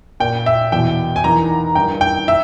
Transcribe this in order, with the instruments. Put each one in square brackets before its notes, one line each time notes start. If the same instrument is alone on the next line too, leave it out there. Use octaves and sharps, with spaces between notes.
[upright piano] A#2 G5
E5
E2 B2 G5
G#5
E2 D#3 A#5
G2 G5
D#3
G5
E5